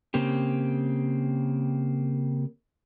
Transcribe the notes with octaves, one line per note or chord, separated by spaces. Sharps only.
C#3 A#3 C4 G4